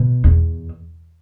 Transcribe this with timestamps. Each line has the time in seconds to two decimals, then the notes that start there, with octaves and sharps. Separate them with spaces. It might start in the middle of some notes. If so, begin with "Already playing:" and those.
Already playing: B2
0.24 E2